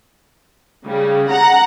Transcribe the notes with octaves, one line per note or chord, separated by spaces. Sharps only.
C#3 G3
F#5 A#5